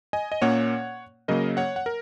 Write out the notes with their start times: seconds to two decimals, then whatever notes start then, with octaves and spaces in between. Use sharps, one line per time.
0.13 D#5 G#5
0.32 D#5
0.42 A#2 A#3 C#4 C#5 F#5
1.28 C#3 F#3 A#3 A#4 D#5
1.57 C#5 F#5
1.76 F#5
1.86 A#4